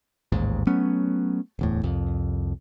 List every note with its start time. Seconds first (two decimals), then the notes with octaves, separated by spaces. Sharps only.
0.32 A1 D#2 G#2
0.67 F#3 A3 B3 C#4
1.59 D1 E2 A2
1.83 C2 F2